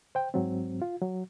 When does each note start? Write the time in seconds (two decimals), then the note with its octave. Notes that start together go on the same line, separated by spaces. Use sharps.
0.15 C5 G5
0.34 G#2 F#3 C4
0.82 F4
1.02 F#3